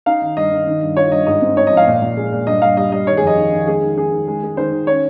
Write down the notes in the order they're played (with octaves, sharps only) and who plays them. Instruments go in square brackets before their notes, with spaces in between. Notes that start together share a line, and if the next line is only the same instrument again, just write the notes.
[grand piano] D#4 F5
D#3
G2 D#5
D#3
D#3
G2
F4 C#5
G2 D#5
G#2 D#5
C4
G#2 C#5
D#5
F3
F5
A#2
A#2
G#3
A#2
G2 D#5
G2 F5
G3 D#5
G3 D#5
D#3 C#5
G#4
F2 D#5
D#3
D#3
G#3 G#4
D#3
D#3 G#4
D#3
G#3
G#3
D#3 C5
D#3
C#4 C#5